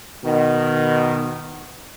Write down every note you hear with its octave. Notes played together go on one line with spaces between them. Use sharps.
B2 D#3